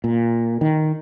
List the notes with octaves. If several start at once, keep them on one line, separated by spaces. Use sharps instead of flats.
A#2
D#3